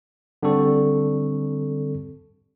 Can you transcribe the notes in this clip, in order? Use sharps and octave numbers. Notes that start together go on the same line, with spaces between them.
D3 G3 C4 A4 C#6